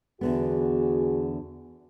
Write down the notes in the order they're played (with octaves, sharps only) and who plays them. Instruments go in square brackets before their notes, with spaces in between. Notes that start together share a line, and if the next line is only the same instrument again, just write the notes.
[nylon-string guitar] E2 D3 B3 [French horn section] F#4 G#4